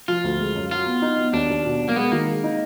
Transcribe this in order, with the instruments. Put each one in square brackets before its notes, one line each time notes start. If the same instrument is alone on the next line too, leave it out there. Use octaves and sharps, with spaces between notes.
[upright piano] F3 [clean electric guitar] F4
[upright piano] D2
G#3
F#2
[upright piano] F#3 [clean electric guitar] F4
[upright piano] B3
D#4
B3
[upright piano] D#2 [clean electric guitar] D4
[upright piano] D#2
B2
F#3
[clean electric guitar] A#3
[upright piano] G#3 [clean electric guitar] B3
[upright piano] D#3 [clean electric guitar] A#3
[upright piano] G#3
D#4